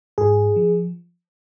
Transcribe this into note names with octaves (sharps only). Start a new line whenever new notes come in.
G#2 G#4
F3